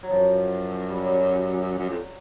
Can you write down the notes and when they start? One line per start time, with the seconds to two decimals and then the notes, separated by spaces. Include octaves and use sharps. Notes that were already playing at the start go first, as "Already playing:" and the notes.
0.03 F#3
0.11 F#2 F3
0.90 G3
0.99 F#3
1.78 F#2
1.89 F2